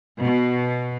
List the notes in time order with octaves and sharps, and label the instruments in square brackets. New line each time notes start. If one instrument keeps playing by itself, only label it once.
[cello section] B2